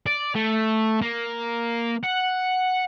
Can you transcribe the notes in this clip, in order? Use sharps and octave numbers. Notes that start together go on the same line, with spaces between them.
D5
A3
A#3
F#5